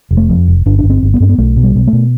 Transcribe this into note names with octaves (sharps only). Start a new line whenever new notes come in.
F1
A3
F2
F1
G1 D4
D4
G1
C4
G1
B3
G2 C4
B3
B1 A3
B2
G3
B2
A3
B2